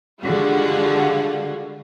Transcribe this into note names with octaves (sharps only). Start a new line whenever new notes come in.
D3 G3 G#3 F4 F#4